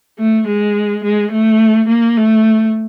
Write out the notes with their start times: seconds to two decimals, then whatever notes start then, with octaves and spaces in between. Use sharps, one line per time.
0.18 A3
0.47 G#3
1.04 G#3
1.32 A3
1.88 A#3
2.17 A3